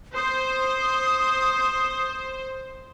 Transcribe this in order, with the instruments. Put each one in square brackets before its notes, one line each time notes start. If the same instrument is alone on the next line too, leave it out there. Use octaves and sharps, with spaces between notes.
[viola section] C5 [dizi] D#6